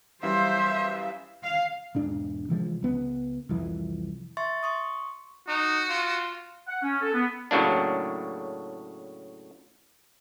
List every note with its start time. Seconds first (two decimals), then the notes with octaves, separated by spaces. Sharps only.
0.23 F#2 E3 G3 C5 E5 F5
1.41 F5
1.95 E1 G#2 D4
2.49 C3 E3 F3 G#3
2.83 C#2 B3
3.49 C2 F2 E3
4.37 E5 C6 C#6 A6
4.63 C6 C#6 D#6
5.48 D#4 F#4
5.89 F4
6.68 F#5
6.83 C#4
7.02 A4
7.14 B3
7.51 A2 C#3 F#3 A#3 D4